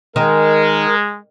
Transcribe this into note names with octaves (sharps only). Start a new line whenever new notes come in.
D#3 G#3 A#4